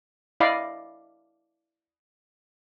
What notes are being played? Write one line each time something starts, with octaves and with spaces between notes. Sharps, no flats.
E4 D5 D#5 F5 B5